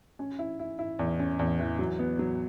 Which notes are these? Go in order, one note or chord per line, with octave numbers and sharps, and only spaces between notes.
C#4
E4
E4
E4
E2
C#4
E2
E3
F#3
B3
F#3